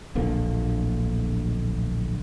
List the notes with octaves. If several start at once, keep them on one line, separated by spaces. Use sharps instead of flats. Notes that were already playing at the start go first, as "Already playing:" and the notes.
D1 A#1 D3 A#3